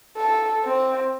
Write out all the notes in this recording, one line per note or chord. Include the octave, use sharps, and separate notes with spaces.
A4
C4